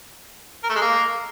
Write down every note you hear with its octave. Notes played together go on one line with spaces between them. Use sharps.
A#4
A3
G#3
A#3